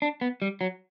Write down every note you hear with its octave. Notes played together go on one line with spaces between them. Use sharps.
D4
B3
G3
F#3